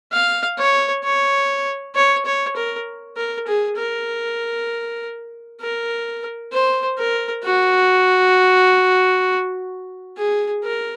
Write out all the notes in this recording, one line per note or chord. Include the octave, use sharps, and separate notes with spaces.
F5
C#5
C#5
C#5
C#5
A#4
A#4
G#4
A#4
A#4
C5
A#4
F#4
G#4
A#4